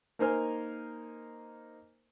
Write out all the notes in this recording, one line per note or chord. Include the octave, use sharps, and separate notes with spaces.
A#3 D#4 A#4 C5 G#5 F6